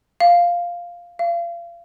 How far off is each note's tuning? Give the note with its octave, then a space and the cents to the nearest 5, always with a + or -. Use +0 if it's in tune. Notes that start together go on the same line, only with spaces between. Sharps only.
F5 +0
F5 -35